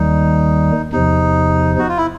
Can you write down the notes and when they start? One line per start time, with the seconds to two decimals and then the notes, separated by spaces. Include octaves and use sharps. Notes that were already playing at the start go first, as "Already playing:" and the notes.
Already playing: D#2 D#3 G3 D#4
0.92 E2 C3 F3 D#4
1.79 F#4
1.89 F4
1.97 E4